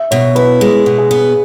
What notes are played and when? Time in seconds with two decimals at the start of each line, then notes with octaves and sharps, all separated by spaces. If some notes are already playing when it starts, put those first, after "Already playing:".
Already playing: E5
0.11 B2 C#5
0.35 E4 B4
0.61 G#3 G#4
0.86 B2
0.98 G#4
1.11 B3